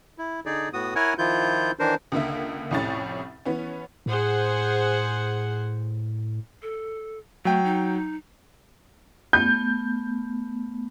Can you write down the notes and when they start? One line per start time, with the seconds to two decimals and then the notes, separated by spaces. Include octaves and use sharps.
0.18 E4
0.46 D3 D#4 G#4 D5
0.73 A2 B3 F#4 D#6
0.95 E4 A#4 C#5 F#5 G#5
1.18 D#3 F3 E4 F4 G6
1.79 D#3 E3 D4 A#4 C5
2.12 C#2 D3 A#3 E5
2.71 C2 F2 A2 C3 C#4 A6
3.46 E3 B3 C#4
4.06 A2 G#4 C5 F#5
6.62 A4
7.45 F#3 A3 G5
7.64 D#4
9.33 A3 B3 G6